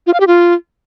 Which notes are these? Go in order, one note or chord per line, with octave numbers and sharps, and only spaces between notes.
F4
F5
G4
F4